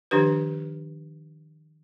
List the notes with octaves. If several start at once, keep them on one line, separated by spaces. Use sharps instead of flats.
D#3 F3 D4 G4 B4